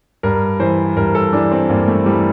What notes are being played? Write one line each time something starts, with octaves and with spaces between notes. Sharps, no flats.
G2 A#4
E3 C5
G2 A#4
A4
E3 D4
C4
G2 A#3
A3
E3 G3